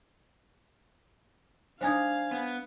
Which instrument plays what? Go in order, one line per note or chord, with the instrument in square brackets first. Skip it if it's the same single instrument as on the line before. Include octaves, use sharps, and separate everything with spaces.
[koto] G3 D4 D#4 [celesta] C5 G#5 G#6 [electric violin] F5
[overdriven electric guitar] B3